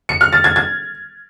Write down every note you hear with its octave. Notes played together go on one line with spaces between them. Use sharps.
C#7
F6
A6
G#6
G#6